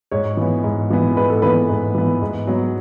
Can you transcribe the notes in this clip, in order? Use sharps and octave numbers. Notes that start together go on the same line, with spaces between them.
G#2 C#5
E3 B3
G#2
E3 B3
G#2 B4
A4
E3 B3 B4
G#2
E3 B3
G#2
F#3 B3